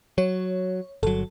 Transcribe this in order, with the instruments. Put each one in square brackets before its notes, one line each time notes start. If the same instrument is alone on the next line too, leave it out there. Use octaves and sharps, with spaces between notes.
[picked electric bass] F#3 [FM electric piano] C#5
[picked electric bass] G1 F#3 [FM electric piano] A4